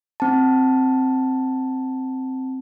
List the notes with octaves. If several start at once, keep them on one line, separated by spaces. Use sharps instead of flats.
C4 A5